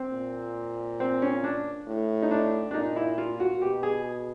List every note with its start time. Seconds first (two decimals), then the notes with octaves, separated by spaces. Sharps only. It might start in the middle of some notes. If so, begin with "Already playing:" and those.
Already playing: C4
0.13 A#2
1.00 C4
1.22 C#4
1.44 D4
1.87 A2
2.22 D#4
2.31 D4
2.71 D4
2.74 A#2 D#4
2.96 E4
3.18 F4
3.40 F#4
3.62 B2 G4
3.83 G#4